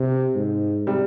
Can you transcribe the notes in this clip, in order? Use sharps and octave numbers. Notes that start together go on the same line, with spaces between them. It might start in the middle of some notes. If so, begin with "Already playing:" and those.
Already playing: C3
G#2
C3 G3